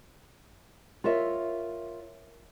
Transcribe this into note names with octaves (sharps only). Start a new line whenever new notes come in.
F4 A#4 C#5 E5